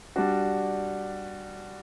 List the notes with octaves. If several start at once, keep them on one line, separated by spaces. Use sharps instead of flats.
G3 D4 F#4